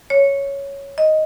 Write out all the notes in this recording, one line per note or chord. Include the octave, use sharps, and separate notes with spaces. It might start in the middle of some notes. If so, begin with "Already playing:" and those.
C#5
D#5